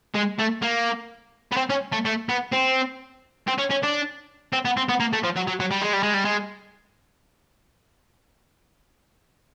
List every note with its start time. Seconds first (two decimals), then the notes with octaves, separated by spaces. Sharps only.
0.15 G#3
0.39 A3
0.62 A#3
1.52 B3
1.57 C4
1.70 C#4
1.92 A3
2.05 A3
2.29 B3
2.52 C4
3.47 C4
3.58 C#4
3.70 C#4
3.83 D4
4.53 C4
4.65 B3
4.77 C4
4.89 B3
5.00 A#3
5.13 A3
5.24 F3
5.36 F#3
5.47 F#3
5.60 F#3
5.71 G3
5.82 G#3
5.93 G3
6.03 G#3
6.14 G3
6.25 G#3